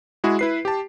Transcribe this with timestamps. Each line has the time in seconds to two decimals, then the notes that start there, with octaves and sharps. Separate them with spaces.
0.24 G#3 E4 F#4 G#4
0.39 E4 B4 C7
0.65 G4 A5